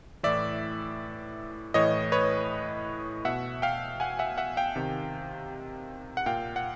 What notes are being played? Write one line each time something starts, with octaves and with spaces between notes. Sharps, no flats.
A2 E3 D5 E5
A2 E3 C#5 D#5
B4 C#5
B2 E5 F#5
F5 G5
F#5 G#5
E5 F#5
E5 F#5
F5 G5
C3 D#3
F#5
A#2 F5 G5
F#5